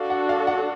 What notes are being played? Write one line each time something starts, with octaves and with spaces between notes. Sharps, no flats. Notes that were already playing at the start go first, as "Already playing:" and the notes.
Already playing: D4 F#4 A4 F5
F#5
F5
F#5